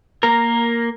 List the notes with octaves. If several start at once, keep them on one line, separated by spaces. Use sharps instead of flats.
A#3 A#4